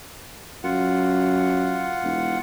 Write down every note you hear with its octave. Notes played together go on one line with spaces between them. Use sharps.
F#2 F4 F#5
E1